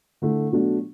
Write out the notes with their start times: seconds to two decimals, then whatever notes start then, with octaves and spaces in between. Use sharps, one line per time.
0.22 D3 A3 E4
0.52 B2 F#3 A3 D4